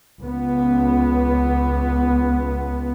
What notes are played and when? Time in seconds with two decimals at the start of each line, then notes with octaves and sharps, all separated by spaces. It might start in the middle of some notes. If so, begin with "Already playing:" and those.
0.20 C#2 B3